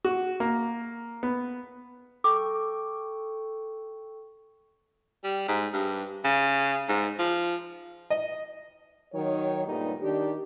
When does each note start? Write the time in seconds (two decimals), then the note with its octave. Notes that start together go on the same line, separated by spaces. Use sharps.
0.05 F#4
0.40 A#3
1.23 B3
2.24 A4 G5 C#6 D6
5.24 G3
5.48 G#2
5.73 G2
6.25 C#3
6.89 G#2
7.19 F3
8.10 D#5
9.13 D#3 F#3 C#5
9.66 G2 A#2 G3 A3 B3 D#4
10.01 D#3 D4 G4